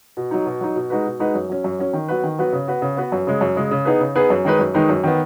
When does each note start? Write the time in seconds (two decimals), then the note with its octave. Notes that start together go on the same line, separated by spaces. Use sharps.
0.17 B2
0.31 F#3 D#4
0.46 B2
0.61 F#3 D#4
0.76 B2
0.90 G#3 D#4 F#4 B4
1.05 B2
1.19 G#3 D#4 F#4 B4
1.35 F#2
1.49 F#3 C#4
1.64 F#2
1.79 F#3 C#4
1.93 D#3
2.08 F#3 B3 F#4 B4
2.24 D#3
2.39 F#3 B3 F#4 B4
2.53 C#3
2.68 B3 F#4 B4
2.82 C#3
2.97 B3 F#4 B4
3.12 F#2
3.27 C#3 G#3
3.41 F#2
3.56 C#3 G#3
3.71 C#3
3.85 B3 D#4 G#4 B4
4.00 C#3
4.15 B3 D#4 G#4 B4
4.30 F#2
4.45 D#3 G#3 D#4 B4
4.59 F#2
4.74 D#3 G#3 D#4 B4
4.89 F#2
5.04 D#3 B3